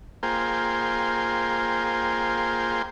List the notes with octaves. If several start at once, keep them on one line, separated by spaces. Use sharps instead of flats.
A#3 F4 G#4 C5 G5